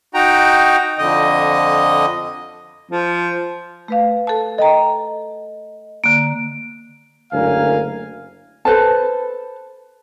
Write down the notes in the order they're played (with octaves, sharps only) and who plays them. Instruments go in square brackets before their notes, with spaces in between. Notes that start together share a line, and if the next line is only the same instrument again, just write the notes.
[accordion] D#4 F#4 G5 A#5
F2 D3 D#5
[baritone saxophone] F3
[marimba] A3 B4 F5
A4 A5
[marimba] A4 G5 A#5 [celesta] D#5
[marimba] D3 A#3 [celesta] D7
[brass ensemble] F#1 D2 A#4 F5 G#5
[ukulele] A4 B4 C5 A5